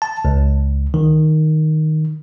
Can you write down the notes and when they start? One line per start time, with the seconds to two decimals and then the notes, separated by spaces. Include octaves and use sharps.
0.02 A5
0.25 C#2
0.94 D#3